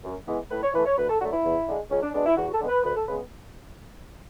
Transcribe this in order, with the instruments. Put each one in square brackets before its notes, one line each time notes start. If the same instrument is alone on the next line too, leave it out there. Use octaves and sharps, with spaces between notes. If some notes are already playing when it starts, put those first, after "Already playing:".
[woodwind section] F#2
E3 G#3 B3
A2 B4
C#5
E3 A3 B4
C#5
D2 B4
A4
D3 F#3 A3 F#4
E4
E2
D3 G#3
C#2 C#4
D4
B2 G#3 B3 D4
E4
E2 F#4
A4
D3 G#3 B3
B4
D2 B4
A4
C#3 G#3 B3 B4